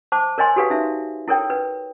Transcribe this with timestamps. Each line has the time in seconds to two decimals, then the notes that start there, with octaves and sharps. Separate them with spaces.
0.12 C5 A5 D6
0.38 A#4 C#5 D#5 G#5 C6
0.56 F#4 G4 A4 B4 C#5 F5
0.70 D#4 E5
1.28 E4 A4 A#4 C#5 G5
1.50 B4